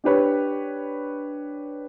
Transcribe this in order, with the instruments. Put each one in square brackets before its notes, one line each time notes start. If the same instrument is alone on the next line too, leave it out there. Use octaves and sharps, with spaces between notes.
[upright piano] D4 G4 B4 C#5